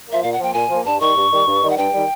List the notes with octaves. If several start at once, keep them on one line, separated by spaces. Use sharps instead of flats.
F3 A#3 E5
A#2 F5
F#5
F3 A#3 G5
A#2 G#5
F3 A#3
G2 A5
D#3 G3 C#6
G2
D#3 G3
G2
D#3 G3
F#5
G2 G5
D#3 G3